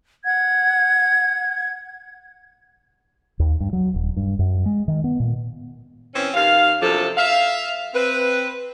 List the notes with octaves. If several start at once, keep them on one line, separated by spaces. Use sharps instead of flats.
F#5 G#6
D#2
G2
F#3
D#1
G2
F#2
G#3
D#3
B3
A#2
E3 C4 C#4
D#2 F5
F#2 C3 F3 D4 A4
E5 F5
C4 B4